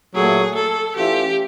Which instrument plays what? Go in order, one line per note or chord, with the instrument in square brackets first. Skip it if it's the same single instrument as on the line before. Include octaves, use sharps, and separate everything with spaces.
[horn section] A#2 F#3 A3 [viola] G#4
[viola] A4
[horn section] E3 A3 C#4 F4 [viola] G4